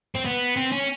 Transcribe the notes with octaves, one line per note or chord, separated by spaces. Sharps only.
C4
B3
C4
C#4